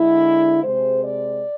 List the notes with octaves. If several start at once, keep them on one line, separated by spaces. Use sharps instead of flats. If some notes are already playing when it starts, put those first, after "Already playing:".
Already playing: D3 G#3 E4
C3 G#3 C5
D5